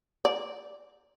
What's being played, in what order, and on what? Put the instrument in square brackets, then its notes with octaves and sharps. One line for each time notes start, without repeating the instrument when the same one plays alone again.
[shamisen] D5